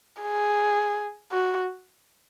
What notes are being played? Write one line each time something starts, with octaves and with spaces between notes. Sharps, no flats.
G#4
F#4